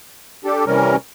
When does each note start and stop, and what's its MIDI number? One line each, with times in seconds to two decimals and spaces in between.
0.45 0.65 62
0.45 0.65 67
0.45 0.65 69
0.66 0.96 48
0.66 0.96 52
0.66 0.96 55
0.66 0.96 61
0.66 0.96 70